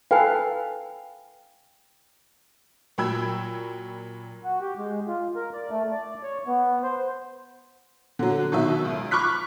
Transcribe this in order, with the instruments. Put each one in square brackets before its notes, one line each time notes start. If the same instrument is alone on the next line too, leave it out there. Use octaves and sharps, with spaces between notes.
[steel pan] A4 B4 F5 [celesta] G5 G#5
[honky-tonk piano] A#2 F#3 G5 B5 E6 G#6
[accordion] F#4
G4
G#3
F4
A#4
D5
A3
D5
C#5
B3
C5
[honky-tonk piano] D3 F#3
B2 D#3 F#3 E5
C#2
B5 C#6 D6 F6 F#6 B6